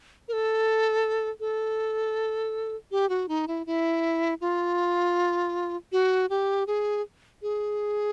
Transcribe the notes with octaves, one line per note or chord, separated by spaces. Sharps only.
A#4
A4
A4
G4
F#4
D#4
E4
E4
F4
F#4
G4
G#4
G#4